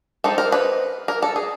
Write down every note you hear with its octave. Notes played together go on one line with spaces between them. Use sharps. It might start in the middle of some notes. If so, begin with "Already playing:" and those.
G#3 C4 D#4 A4
A#4
B4
A#4
A4
G#4